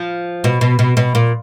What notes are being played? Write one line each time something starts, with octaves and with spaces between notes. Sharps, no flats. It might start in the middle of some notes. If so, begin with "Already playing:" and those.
Already playing: F3
B2
B2
B2
B2
A#2